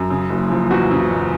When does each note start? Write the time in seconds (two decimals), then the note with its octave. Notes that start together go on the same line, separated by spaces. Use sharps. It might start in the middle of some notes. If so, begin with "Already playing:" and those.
Already playing: F#2
0.10 C#3
0.30 F#1
0.50 F3
0.70 E2 F#4
0.91 C#3
1.10 F#1